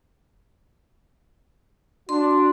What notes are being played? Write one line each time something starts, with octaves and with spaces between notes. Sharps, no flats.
D4 F#4 C6